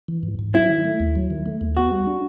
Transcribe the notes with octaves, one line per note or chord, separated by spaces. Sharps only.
E3
G#2
G#2
F#3 E4
D#3
A3
D#2
F#3
D#3
A3
D#2
B3 F#4
G3
D4